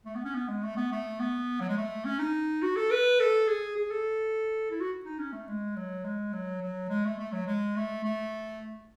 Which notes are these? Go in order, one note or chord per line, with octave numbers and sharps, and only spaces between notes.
A3
B3
C#4
B3
G#3
A3
B3
A3
B3
F#3
G#3
A3
C#4
D#4
F#4
A4
B4
A4
G#4
G#4
A4
E4
F#4
D#4
C#4
A3
G#3
F#3
G#3
F#3
F#3
G#3
A3
A3
F#3
G#3
A3
A3